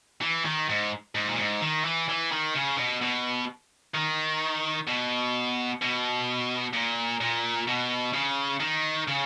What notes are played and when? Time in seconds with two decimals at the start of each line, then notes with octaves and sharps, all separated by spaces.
0.21 E3
0.45 D#3
0.69 G#2
1.15 G#2
1.27 A#2
1.39 G#2
1.61 D#3
1.85 E3
2.09 E3
2.31 D#3
2.55 C#3
2.77 B2
3.01 B2
3.95 D#3
4.87 B2
5.81 B2
6.74 A#2
7.21 A#2
7.67 B2
8.13 C#3
8.60 D#3
9.08 C#3